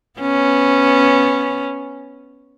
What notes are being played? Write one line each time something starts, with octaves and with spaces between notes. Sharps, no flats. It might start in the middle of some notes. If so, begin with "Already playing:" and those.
B3 C#4